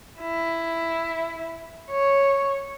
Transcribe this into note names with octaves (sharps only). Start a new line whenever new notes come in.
E4
C#5